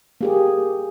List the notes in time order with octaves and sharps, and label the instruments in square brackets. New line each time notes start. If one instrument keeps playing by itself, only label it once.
[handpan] A#3 G4 G#4